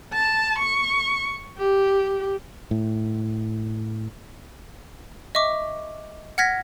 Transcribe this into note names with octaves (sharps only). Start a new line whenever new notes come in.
A5
C#6
G4
A2
D#5 E5 C#6 D6
F#5 F6 G#6 A#6 B6